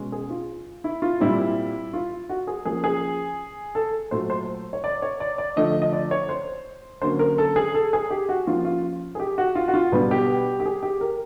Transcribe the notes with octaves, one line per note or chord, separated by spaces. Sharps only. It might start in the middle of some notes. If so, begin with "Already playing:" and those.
Already playing: B2 G#3 C#4
G#4
F4
E4
F4
A#2 G3 C4 E4
F4
F#4
G#4
F3 A#3 C#4 G#4
G#4
A4
A#2 F#3 A3 C5
C5
C#5
D5
C#5
D5
D5
D3 F3 A3 D#5
D#5
D5
C#5
C5
D3 F#3 A#3 C#4 C5
A#4
A4
G#4
A4
G#4
G4
F#4
F3 A#3 C#4 F4
F4
G#4
G4
F#4
F4
F#4
F4
B2 G3 B3 D4
G4
G4
G#4
G4
A#4